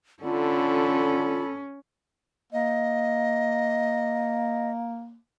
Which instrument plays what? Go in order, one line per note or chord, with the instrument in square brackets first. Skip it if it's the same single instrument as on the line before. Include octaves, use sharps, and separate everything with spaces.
[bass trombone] D3 [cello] C#4 [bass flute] F4 [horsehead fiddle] A4 B5
[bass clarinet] A#3 [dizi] D#5